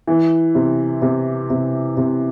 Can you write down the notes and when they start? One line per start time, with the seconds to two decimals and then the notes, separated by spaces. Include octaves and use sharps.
0.07 E3
0.55 C3
1.02 C3
1.50 C3
1.97 C3